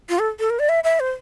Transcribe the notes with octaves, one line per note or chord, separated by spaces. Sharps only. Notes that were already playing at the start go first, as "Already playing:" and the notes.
F4
A4
A4
A#4
D5
E5
E5
C5